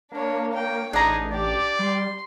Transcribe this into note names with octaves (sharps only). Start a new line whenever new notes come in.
A#3 D4 C#5
C#5 G5
A1 D4 D#4 G#4 A#5
G4 D5
G3 C6